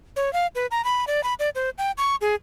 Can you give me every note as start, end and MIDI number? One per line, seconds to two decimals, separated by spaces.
0.16 0.32 73
0.33 0.47 77
0.55 0.66 71
0.71 0.84 82
0.84 1.05 83
1.07 1.23 74
1.23 1.34 83
1.39 1.49 74
1.55 1.70 72
1.78 1.91 79
1.98 2.16 85
2.21 2.35 68